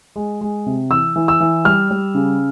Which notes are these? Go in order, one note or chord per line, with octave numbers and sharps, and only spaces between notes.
G#3
G#3
C3
E3 E6
E3
E6
E3
G3 F6
G3
C#3